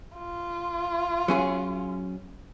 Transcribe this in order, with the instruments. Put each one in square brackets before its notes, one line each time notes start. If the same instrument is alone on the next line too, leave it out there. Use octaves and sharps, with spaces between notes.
[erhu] F4
[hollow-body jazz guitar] F#3 C#4 G#4